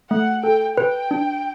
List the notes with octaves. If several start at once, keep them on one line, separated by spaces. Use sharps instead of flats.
A3 F#5
A4 G5
B4 G5
D4